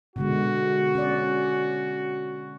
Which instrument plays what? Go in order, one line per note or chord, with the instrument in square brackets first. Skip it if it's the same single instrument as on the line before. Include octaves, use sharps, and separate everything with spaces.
[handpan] B2 D3 G#3 [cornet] F#4
[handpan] C#4 D5